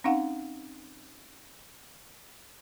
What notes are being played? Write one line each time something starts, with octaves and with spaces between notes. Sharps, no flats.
C4 C#4 D#4 F5 F#5